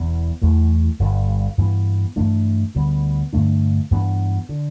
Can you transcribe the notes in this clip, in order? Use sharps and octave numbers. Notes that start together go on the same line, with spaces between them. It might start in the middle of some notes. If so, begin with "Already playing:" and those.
Already playing: E1 E2 E3 B3
E2 E3 A3
G1 G2 G3
G2 E3 B3
G2 E3 A3 D4
D2 D3 G3 B3
G2 D3 A3 D4
G2 E3 B3 D4
D3